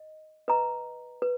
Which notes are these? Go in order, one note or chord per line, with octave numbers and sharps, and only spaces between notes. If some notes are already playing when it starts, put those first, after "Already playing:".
Already playing: D#5
B4 D#5 A#5
B4